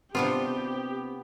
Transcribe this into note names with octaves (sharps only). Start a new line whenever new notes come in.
C3 B3 C4 D4 F4 G4